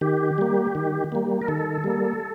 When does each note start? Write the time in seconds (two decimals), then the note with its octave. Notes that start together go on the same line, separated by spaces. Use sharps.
0.01 D#3 G4
0.38 G3 A#3
0.75 D#3
1.12 G3 A#3
1.42 A#4
1.48 D#3 A4
1.84 G3 A#3